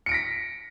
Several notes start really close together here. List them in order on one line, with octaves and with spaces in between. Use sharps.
C#7 D7 A#6 B6